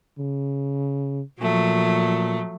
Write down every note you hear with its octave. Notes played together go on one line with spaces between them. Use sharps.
C#3
A#2 F3 F#3 A3